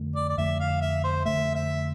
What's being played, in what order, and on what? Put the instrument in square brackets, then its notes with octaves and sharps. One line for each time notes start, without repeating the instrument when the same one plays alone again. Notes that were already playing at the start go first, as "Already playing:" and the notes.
Already playing: [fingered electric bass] F2 D3 A3
[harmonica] D5
D5
[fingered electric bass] F2 D3 A3 [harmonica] E5
[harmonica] F5
E5
C5
[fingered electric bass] F2 D3 A3 [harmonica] E5
[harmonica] E5